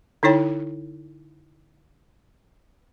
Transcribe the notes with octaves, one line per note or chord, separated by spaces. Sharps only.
D3 D#4 E4 C#5 G5